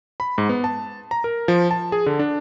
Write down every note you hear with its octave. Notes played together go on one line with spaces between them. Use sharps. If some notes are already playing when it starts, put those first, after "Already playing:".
B5
G#2
B3
A5
A#5
A#4
F3
A5
G#4
D3
D4